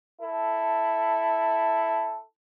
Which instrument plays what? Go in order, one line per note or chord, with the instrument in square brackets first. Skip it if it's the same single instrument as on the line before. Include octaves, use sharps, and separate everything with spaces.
[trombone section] E4 A4